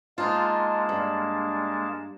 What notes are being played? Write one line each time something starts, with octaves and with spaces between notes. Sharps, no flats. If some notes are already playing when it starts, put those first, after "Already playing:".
G#3 A#3 D#4 F4 A5
G2